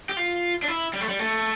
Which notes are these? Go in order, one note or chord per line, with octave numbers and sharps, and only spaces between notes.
G4
F4
D4
E4
G3
A3
G3
A3